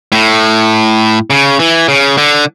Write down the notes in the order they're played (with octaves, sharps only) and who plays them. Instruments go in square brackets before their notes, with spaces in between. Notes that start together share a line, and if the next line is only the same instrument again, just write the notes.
[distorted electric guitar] A2
C#3
E3
C#3
D3